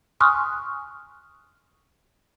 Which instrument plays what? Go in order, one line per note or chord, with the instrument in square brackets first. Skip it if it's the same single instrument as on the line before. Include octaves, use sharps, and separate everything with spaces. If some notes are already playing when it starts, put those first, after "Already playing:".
[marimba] G#5 C6 C#6 D#6 F6 F#6